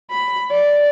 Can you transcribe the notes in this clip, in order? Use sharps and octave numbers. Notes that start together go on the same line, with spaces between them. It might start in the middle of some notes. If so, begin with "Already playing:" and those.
B5
D5